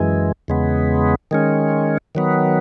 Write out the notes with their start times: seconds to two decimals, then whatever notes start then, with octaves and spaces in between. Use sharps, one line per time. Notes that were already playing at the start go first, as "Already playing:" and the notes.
Already playing: F#2 E3 G#3
0.48 E2 C#3 G#3 B3
1.31 D#3 G#3 C#4
2.15 D#3 F#3 B3